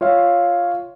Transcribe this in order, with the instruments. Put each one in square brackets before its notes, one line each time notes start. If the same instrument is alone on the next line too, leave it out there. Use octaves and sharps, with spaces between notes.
[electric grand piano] F4 C#5 E5 F5